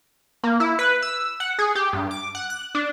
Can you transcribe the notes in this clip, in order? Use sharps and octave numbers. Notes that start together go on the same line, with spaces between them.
A#3
E4
B4
E6
F#5
G#4
G4
G2
D6
F#5
F#6
D4